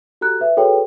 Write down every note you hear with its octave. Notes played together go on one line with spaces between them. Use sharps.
F#4 G4 A4 A#5 F#6
B4 E5
F#4 G#4 A4 B4 C#5 G5